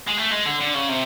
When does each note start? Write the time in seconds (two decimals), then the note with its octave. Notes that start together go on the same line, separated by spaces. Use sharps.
0.08 G#3
0.18 A3
0.32 G#3
0.46 D3
0.61 D3
0.74 C#3
0.89 C3